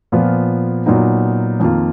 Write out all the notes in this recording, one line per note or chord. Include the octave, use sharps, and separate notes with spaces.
A#2 F3 B3 F4
A#2 F#3 B3 D#4
F2 D#3 A#3 F4